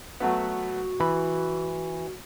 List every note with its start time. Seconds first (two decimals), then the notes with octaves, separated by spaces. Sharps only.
0.20 F#3 A3 B3 F#4
1.00 E3 B5